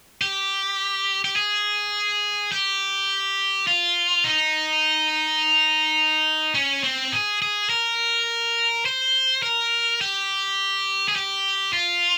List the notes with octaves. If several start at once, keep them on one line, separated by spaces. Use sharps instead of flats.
G4
G4
G#4
G4
F4
D#4
C#4
C4
G#4
G#4
A#4
C5
A#4
G4
G#4
G4
F4